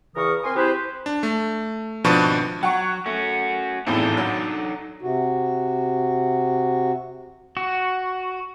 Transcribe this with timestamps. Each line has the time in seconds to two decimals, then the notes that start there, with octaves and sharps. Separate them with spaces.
0.16 E2 C#3 E3 A#4 C#6 D#6
0.44 C4 A#4 G#5 C6
0.55 C4 E4 G4 G#4 B4 C5
1.06 D4
1.23 A3
2.04 G#1 B2 F3 D4 B4 C#6
2.63 F#3 F#5 C#6
3.06 A3 C#4 F#4
3.87 G#1 E2 A2 D4 D#4 A4
4.17 F#3
5.02 C3 F#4
7.57 F#4